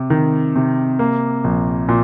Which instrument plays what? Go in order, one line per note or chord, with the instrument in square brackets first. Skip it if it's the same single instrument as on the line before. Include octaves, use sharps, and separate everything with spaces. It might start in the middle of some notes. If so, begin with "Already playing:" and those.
Already playing: [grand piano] C3
D#3
C3
A#3
A#1
A#2